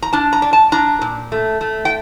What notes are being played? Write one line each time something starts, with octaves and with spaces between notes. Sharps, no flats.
A#5
D4 A5
A#5
D4
A5
D4 A#5
A#2
A3
A3
G5